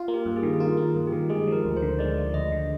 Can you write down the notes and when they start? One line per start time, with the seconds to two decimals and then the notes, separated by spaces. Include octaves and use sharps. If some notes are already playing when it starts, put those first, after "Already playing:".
Already playing: F4
0.08 A#3
0.14 G4
0.26 G2
0.36 G#4
0.43 D#3
0.54 G#4
0.60 F4 A#4
0.77 A#3
0.83 G#4
0.95 G2
1.07 G4
1.12 D#3
1.29 G#3 G#4
1.47 F3
1.52 A#4
1.65 D2
1.77 C5
1.82 D3
1.99 G#3 D5
2.17 F3
2.34 D2 D#5
2.52 D3